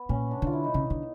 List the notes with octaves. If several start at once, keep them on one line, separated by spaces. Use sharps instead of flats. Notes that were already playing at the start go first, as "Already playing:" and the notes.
Already playing: B3
A#2 C#4
D4
D3 F4
E4
D#4
C#3
D3